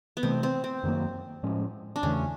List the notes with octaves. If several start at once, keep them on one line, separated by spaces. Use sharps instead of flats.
B3
C3 E3 A3 C4
C4
C4
F#2 D#3 F#3 A#3
A2 F3 G#3 C#4
D4
E2 C#3 E3 A3 C#4